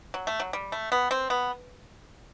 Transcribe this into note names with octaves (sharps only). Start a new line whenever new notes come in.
F#3
A3
F#3
G3
A3
B3
C4
B3